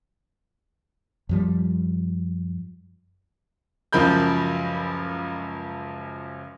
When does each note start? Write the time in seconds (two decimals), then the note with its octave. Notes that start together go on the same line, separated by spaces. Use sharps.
1.29 F#2 F3 G3
3.93 C#2 F#2 F3 A#4 B5 G6